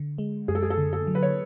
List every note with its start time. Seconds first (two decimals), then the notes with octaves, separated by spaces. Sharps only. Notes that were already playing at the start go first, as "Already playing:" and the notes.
Already playing: D3
0.18 G#3
0.48 F#2 G#4
0.55 A4
0.63 G#4
0.70 A4
0.78 D3
0.93 A4
1.07 F#3
1.15 B4
1.23 C#5